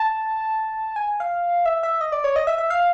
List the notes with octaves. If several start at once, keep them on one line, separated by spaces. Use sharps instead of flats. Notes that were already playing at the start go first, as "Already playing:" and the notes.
Already playing: A5
G#5
F5
E5
E5
D#5
D5
C#5
D#5
E5
E5
F5